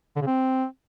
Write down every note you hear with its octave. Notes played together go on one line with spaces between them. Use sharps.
D3
C#3
C4